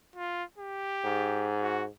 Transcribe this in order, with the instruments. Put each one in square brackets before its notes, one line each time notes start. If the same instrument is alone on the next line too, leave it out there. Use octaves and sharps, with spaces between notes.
[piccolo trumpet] F4
G4
[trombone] G#2
[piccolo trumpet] F#4